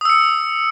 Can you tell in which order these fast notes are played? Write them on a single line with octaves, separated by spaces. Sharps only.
D#6 E6 C#7